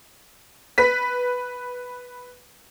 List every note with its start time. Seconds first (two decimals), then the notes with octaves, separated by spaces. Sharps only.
0.78 B4 B6